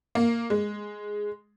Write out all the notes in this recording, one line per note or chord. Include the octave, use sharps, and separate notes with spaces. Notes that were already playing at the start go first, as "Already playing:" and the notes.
A#3
G#3